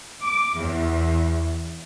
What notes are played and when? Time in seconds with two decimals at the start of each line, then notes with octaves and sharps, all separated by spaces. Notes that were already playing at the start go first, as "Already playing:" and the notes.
0.22 D6
0.56 E2